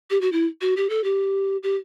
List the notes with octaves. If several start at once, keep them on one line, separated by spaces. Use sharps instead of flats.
G4
F#4
E4
F#4
G4
A4
G4
G4